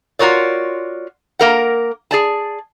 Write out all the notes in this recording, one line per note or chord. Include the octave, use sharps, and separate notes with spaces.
F4 F#4 A#4 C#5 D5
A#3 A#4 F#5
G#4 D5 A5